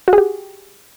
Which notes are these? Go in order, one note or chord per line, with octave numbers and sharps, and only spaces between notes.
F#4
G#4
G4